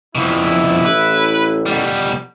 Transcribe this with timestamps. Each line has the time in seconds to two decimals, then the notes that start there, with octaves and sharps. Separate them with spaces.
0.15 F2 B2 E4
0.85 A1 B4
1.66 B2 G3